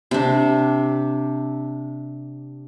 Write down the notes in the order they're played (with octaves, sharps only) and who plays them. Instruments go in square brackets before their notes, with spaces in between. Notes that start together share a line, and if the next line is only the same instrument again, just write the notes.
[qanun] C3 D4